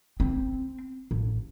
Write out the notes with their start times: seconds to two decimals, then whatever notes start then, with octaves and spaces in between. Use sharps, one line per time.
0.20 C4
1.11 A1